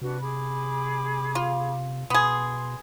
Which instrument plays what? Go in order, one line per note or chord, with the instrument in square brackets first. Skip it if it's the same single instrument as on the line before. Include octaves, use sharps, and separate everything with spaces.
[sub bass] C3 [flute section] D4 F#4 B4
[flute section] G#4 B5 D6
[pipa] F4
[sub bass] B2 [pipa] B3 G#4 [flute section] C6